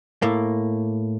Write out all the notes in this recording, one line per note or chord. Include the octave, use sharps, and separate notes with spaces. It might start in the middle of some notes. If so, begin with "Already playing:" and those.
A2 A#3